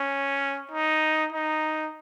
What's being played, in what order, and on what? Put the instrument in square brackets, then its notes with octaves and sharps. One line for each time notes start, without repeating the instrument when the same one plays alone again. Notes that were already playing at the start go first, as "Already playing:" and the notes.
Already playing: [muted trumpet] C#4
D#4
D#4